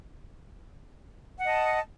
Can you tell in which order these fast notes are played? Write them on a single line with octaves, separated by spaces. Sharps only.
F#5 D#5 A5